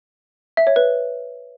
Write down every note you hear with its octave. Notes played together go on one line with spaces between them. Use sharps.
E5
C#5
B4